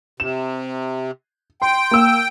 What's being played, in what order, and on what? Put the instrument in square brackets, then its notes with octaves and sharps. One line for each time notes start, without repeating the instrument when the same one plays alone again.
[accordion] C3 [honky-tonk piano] E7
[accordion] G5 [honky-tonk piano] C6
[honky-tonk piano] A#3 E6